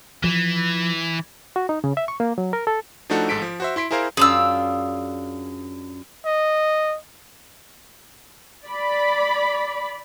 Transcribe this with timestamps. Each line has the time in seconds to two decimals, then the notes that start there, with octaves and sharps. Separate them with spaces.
0.24 E3 F3
1.56 F#4
1.69 D#4
1.84 C#3
1.97 E5
2.08 C#6
2.20 A#3
2.38 F#3
2.53 A#4
2.67 A4
3.10 F3 A3 D4 D#4 F#4 A4
3.29 A1 G#2 A4 B6 D7
3.42 F3
3.60 F#4 C5 E5
3.76 E4 C6 B6 D7
3.91 E4 G#4 A#4 C5 F5
4.17 F#2 D4 F4 G#4 E6
6.26 D#5
8.66 D5 B5